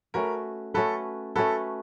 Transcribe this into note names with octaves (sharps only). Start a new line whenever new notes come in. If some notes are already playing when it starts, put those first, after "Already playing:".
A3 C#4 F#4 A#4 B4
A3 C#4 F#4 A4 B4
A3 C#4 F#4 A4 B4